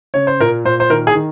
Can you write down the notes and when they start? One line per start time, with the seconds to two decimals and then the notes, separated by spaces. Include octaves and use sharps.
0.14 C#3 C#5
0.27 C5
0.40 A#2 A#4
0.65 A#2 C5
0.80 C5
0.90 D#3 A#4
1.07 G#4
1.15 D#3